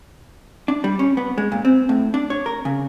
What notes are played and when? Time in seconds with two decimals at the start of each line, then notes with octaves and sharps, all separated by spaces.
0.68 D4
0.84 G3
0.99 C#4
1.17 B3
1.38 G#3
1.52 A#2
1.65 C4
1.89 A2
2.14 D4
2.30 C#5
2.46 A#4
2.65 C#3